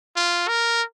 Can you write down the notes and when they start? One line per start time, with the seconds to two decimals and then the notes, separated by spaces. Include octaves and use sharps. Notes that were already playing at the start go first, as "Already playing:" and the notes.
0.16 F4
0.48 A#4